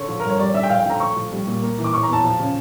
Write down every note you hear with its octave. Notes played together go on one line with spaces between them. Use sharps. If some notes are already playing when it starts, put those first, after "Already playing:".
Already playing: D3 C#5
F3
G2 A#4
C#5
G3 D5
D3 E5
G5
F3 F5
G5
D3 A#5
A3 C#6
F3
G3
A#2
A#3
E3
D6
E3 C#6
A#5
E2 A5
F3
C#3